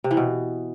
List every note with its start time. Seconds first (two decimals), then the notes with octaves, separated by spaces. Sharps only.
0.04 C3
0.11 E3
0.17 B2